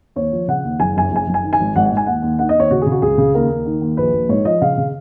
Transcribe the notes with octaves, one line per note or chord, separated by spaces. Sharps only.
D#2 C#5
F3
C#3 F#5
D#2
F#1 G#5
F#2 G#5
F#1 G#5
F#1
G#5
D#3
G#5
G#1
G#1 F#5
F#5
G#2
G#5
D#2 F#5
D#2
D#3 F#5
D#5
D#2
C#5
C#3 F#4
G#4
C#3
F#4
C#2 G#4
C#3
D#2 A#4
D#2
D#3
D#2
A#1 B4
A#1
G#2 C#5
F3 D#5
C#3 F5
C#3